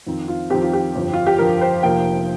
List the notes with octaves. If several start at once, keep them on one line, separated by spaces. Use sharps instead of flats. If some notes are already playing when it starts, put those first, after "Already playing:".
F2 D#3 C4
F4
F2 D#3 C4 G4
F4
G4
G1 F2 F3
F4
G4
G1 F2 F3 A#4
C5
F1 F2 F3 A#3 G5